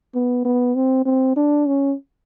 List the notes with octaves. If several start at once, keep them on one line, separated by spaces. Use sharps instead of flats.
B3
B3
C4
C4
D4
C#4